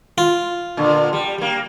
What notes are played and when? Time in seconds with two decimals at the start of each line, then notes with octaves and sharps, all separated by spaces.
0.18 F4
0.77 A#2 D3
1.13 G3
1.38 G3 A#3